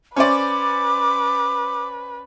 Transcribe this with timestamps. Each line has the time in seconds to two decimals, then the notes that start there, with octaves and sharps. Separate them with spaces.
0.16 C#4 B4 C5 D5 D6